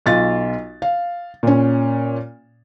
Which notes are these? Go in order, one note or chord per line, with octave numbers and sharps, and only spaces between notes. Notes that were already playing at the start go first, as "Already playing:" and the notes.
B1 F4 A6
F5
A#2 C#4